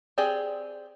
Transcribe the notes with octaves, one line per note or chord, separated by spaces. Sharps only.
C4 G4 G#4 D5